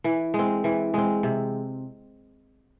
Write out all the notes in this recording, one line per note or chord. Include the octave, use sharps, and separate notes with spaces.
E3
G#3
C4
E3
G#3 C4
C3